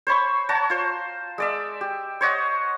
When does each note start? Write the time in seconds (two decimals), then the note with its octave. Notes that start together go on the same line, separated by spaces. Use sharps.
0.07 C5 C#5 B5 C#6
0.49 C#5 F#5 A5 A#5
0.70 F4 C5
1.38 G#3 D5 E5
1.81 G4
2.21 C5 C#5 D#5 F#5